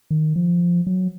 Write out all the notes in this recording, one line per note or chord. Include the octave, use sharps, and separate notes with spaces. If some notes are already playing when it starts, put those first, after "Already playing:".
D#3
F3
F#3